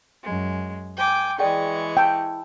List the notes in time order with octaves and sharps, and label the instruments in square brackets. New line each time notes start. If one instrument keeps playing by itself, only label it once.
[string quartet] F#2 G#3
G5 G#5 D6
[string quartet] E3 G#3 C#6 [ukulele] G#4 D5 G5
[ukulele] E4 A5 [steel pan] G5